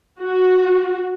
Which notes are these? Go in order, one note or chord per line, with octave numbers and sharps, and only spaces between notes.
F#4